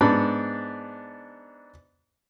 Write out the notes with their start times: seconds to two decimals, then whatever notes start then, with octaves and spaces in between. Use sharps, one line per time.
0.01 G#2 B3 D4 B5